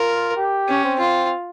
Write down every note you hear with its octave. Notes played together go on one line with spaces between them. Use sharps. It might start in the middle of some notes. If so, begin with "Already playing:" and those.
Already playing: F4 A#4
G4
C#4
C4
F4